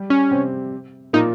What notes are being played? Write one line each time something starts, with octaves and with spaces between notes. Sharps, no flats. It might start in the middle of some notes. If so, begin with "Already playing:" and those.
Already playing: G3 G4
C#4
C3 C4
A#2 A#3 D#4